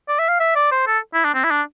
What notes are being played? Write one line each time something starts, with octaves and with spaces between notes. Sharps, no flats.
D5
E5
F5
E5
D5
C5
A4
E4
D4
C4
E4
D4